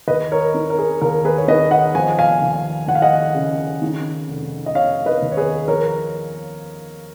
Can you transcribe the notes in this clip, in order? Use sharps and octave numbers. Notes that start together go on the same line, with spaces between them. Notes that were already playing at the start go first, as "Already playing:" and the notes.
D#2 B4 D#5
A#4 C#5
D#3
A#4
G#4
D#2 A#4
G#4 B4
C#5
D#3 B4 D#5
D#5 F#5
F3 G#5
F5 G#5
D#2
D#2 F#5
F5
D#5 F#5
C#3
D#3
F1
D#5
F1 C#5 F5
B4 D#5
D#2
C#5
G#4 B4
F3 A#4 C#5